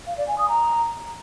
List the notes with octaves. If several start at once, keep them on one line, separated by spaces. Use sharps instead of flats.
F5
D5
G#5
D#6
A#5